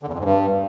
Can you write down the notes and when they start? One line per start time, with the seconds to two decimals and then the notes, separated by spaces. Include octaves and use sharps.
0.03 D3
0.08 E2
0.14 F2
0.19 G#2
0.24 G2